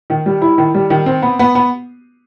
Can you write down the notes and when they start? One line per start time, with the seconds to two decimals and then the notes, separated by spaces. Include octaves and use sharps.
0.10 D#3
0.26 G3
0.42 E4
0.58 D#3
0.75 G3
0.90 D#3
1.06 C4
1.22 B3
1.39 B3
1.55 B3